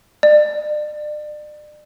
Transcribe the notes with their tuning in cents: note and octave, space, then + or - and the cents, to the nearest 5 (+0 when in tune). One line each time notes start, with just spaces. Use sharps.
D5 +35